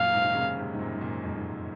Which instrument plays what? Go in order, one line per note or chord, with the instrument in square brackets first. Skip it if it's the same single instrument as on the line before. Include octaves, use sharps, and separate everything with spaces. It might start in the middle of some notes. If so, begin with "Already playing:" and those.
Already playing: [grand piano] F#2 A#2 [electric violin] F5
[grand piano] G#2 C3
D#3
A#2 C#3
G#2 C3
G#2
F#2 A#2
G#2
F#2 A#2
F2 G#2
G#2
F#2